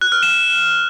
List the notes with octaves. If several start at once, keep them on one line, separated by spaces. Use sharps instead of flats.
F#6
F6
E7